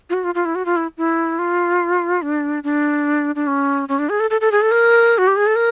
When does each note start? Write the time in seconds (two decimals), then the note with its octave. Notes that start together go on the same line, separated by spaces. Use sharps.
0.10 F4
0.14 F#4
0.24 F4
0.35 F4
0.45 E4
0.55 F#4
0.65 F4
0.76 E4
0.97 E4
1.39 F4
2.22 D4
2.64 D4
3.35 D4
3.47 C#4
3.89 C#4
3.99 D4
4.09 G#4
4.20 A4
4.30 A4
4.41 A4
4.52 G#4
4.62 A4
4.71 A#4
5.18 F#4
5.28 G4
5.36 G#4
5.47 A4
5.56 A#4